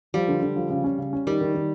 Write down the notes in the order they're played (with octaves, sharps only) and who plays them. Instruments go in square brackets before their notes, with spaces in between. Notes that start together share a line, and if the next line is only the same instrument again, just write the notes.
[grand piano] F3 [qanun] G3
[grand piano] D3
D3
F3
C#3
C#4
C#3
C#4
[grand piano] D#3 [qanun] G3
[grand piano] D#3
D#3